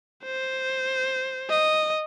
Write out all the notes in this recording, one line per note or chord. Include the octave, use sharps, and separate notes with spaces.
C5
D#5